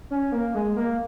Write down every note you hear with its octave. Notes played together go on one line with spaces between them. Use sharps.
C#4
A#3
G#3
A#3